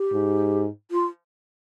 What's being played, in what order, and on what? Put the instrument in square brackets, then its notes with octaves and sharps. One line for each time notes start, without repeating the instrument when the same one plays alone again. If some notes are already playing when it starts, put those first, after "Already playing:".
Already playing: [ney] G4
[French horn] G#2
[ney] F4